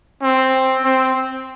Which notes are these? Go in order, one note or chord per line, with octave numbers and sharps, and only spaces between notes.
C4
C4